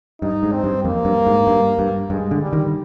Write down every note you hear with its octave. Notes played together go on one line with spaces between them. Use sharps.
G2 D#4
G#2
C4
G2
F2 A#3
G2
G#2
G2
G2
G2 G#3
D3
G3
D#3